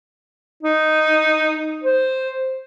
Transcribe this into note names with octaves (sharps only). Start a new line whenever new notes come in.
D#4
C5